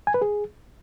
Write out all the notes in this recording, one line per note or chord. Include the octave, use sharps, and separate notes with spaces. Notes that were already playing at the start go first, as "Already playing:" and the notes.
G#5
B4
G#4